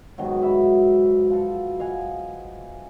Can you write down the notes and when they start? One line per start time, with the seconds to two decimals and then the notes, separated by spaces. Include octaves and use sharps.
0.18 G#2 B2 D#3 F#3
0.43 E5 B5
1.30 F3 F#4 A4
1.79 D#5 F5 F#5 G#5